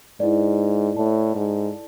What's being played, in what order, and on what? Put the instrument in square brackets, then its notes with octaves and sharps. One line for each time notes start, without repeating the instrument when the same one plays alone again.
[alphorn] G#2 [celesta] E4 B4 D5
[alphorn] A2 [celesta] E4 A4 D5 A5
[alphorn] G#2